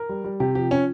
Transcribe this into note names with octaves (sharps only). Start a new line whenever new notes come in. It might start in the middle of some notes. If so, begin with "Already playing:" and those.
Already playing: A#4
G3
G3
C3 G4
F3 G4
C#4